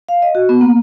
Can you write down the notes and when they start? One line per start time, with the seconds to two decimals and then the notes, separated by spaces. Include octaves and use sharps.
0.09 F5
0.22 D#5
0.35 F#4
0.49 B3
0.61 A#3